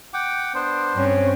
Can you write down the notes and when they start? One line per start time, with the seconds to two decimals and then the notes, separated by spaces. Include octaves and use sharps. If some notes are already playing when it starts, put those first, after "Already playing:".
0.14 F#5 G5 D6
0.54 B3 D4 C5
0.94 G2 C4 C#4